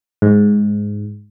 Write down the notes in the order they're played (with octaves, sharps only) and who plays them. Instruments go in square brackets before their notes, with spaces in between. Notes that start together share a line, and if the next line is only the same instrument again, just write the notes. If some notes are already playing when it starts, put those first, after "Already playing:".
[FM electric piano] G#2